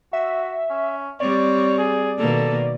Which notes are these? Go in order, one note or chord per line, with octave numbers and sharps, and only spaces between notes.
F#4 E5
C#4
G3 C4 C#5 D5
G#4
B2 D#3 A#3 A4